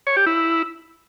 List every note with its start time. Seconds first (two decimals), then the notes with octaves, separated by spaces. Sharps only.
0.07 C#5
0.17 G4
0.26 E4